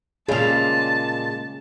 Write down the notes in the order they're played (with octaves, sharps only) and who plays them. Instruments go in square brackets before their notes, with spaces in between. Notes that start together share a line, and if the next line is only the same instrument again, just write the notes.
[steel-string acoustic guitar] A#2 G#3 [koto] C#3 G3 F5 [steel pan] G#4 [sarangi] A5